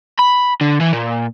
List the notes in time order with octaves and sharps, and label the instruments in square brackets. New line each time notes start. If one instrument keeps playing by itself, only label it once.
[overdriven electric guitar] B5
D3
E3
A#2